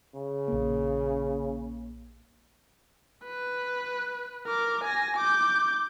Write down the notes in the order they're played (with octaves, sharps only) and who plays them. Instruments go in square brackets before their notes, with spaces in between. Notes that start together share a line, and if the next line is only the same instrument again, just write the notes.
[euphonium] C#3
[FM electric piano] A#1 A#3
[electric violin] B4
A#4 D6
G#5 A#6
D6 G6